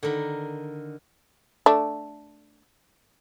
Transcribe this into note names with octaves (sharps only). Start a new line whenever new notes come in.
D3 D#3 A#4 B5
A3 D4